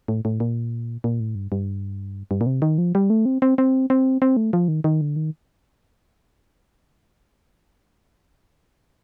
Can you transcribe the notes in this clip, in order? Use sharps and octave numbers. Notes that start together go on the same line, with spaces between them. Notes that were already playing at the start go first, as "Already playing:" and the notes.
A2
A2
A#2
A#2
A2
G2
G2
G2
A#2
C3
D#3
F3
G3
A3
C4
C4
C4
C4
C4
A3
F3
D#3
D#3
D3
D#3